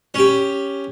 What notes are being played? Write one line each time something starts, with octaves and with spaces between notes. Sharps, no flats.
C#4 G4